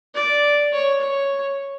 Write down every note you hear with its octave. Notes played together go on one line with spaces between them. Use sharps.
D5
C#5
C#5